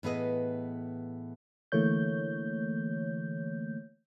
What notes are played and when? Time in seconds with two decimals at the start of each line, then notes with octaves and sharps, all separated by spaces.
0.03 A2 E3 B3 G#4 B4 D#5
1.72 D3 E3 A3 A#3 C#5 G6